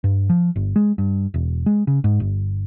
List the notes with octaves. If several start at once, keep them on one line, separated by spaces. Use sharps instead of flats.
G2
F3
G1
G#3
G2
E1
G#3
C#3
G#2
G1